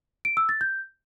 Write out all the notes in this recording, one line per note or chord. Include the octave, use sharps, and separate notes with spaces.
D7
E6
A6
G6